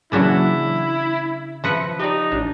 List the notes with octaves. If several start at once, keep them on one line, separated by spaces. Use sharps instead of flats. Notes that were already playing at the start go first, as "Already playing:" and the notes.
A#2 C#3 E3 F#3 D4 E4 F#4
F3 B4 E5 A#6 C#7
D#4 G4 D5
A1 D4